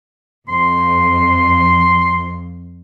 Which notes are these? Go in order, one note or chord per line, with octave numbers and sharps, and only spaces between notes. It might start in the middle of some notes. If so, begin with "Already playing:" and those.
F2 C6